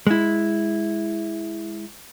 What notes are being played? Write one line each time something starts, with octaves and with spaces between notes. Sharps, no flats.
G#3 E4